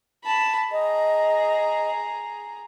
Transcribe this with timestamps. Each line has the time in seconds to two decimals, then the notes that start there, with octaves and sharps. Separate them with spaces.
0.25 A5 B5
0.72 G#4 D#5 A#5